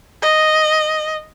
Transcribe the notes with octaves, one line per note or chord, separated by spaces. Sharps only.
D#5